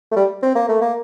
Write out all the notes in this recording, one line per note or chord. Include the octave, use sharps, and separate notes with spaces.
A3
G3
C4
A#3
A3
A#3